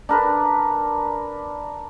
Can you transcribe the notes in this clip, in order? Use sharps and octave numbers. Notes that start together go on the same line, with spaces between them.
D4 A#4 B4